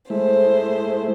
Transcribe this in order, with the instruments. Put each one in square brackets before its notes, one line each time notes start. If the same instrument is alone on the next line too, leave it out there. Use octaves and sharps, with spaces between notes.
[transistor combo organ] G#3 A3 E4 [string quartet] C5